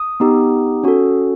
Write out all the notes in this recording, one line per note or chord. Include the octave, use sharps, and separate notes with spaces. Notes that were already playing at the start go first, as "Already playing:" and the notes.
Already playing: D#6
B3 D#4 G4
C#4 F#4 A4